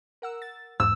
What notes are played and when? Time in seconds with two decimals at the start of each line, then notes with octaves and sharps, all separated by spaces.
0.22 A#4 F#5 E6
0.42 A6
0.80 E2 G#2 E6